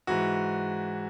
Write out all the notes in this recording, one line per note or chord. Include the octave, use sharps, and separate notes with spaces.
G#2 E3 F#4